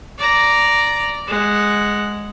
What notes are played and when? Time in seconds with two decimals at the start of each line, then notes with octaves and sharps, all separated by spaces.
0.18 D5 A#5
1.27 G#3 F#5